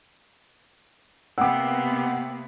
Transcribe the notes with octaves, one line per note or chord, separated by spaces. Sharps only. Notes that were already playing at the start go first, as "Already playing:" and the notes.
C3 A#3 B3 F#5 G5 D6 E6